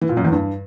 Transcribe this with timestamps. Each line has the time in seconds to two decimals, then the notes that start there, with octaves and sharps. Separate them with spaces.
0.01 E3
0.09 A#2
0.17 F#2
0.25 E2
0.32 G2